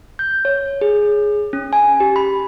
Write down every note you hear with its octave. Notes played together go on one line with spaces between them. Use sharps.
G6
C#5
G#4
C#4
G#5
G4
B5